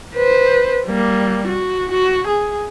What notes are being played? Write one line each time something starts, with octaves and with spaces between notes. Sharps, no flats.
B4 C5
G3 A#3
F#4
F#4
G#4